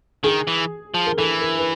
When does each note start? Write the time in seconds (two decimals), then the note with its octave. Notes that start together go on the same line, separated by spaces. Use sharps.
0.24 D#3 G#4
0.47 E3
0.94 F3
1.06 A#4
1.17 E3 A4
1.41 A#4
1.59 B4